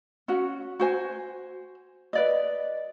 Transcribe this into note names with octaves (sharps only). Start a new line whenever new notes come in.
C#4 F#4
F#4 C5 G#5
B4 D5 D#5